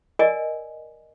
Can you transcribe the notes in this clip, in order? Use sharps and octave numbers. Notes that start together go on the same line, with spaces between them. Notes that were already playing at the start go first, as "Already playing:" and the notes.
A#4 D5 D#5 G#5